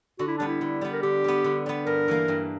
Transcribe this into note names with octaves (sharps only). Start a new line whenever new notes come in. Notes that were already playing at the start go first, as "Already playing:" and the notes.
D3 F#4
E4
G3 B3 D4
E4
D3
G3 B3
A#4
D3 G4
G3 B3
D3
G3 B3
G2 A#4
E3 A#3
G2